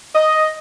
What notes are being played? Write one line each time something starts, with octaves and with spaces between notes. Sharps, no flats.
D#5